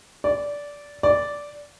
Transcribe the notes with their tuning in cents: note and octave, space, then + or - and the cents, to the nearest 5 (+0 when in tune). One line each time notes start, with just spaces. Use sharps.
D5 -15
D5 -10